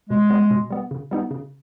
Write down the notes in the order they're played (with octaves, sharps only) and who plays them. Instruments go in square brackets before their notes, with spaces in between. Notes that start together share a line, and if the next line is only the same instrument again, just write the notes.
[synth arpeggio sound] B2 [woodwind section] G#3
[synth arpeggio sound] G3 B3
B2
G3 B3
C#3
G3 B3 D#4
C#3